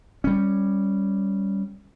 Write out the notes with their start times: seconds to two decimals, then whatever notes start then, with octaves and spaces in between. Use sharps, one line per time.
0.24 G3 C#4